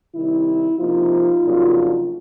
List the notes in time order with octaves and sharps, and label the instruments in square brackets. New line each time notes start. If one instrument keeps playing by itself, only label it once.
[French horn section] C3 D#3 G3 E4
C3 F3 A#3 D#4 F4
F2 C#3 F#3 A#3 D4